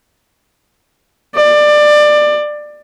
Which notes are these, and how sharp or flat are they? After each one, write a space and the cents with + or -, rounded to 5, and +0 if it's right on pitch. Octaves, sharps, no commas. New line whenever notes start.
D5 +20